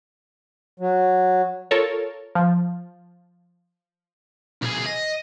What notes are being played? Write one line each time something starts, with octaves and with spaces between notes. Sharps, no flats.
F#3
F4 A4 A#4 C#5
F3
B1 G#4
D#5